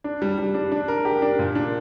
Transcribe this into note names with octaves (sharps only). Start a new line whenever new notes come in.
D4
G3
G3
D4
D4
A#4
G4
D4
A#2
D4